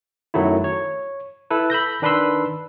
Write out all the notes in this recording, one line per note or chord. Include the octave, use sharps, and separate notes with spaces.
F#2 D#3 F#3 A3 E4
C#5
E4 A4 B4
B5 E6 G6 A#6
D#3 D4 B4 B5 C6 E6